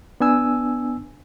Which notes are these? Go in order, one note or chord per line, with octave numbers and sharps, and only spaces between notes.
B3 D4 G#5 E6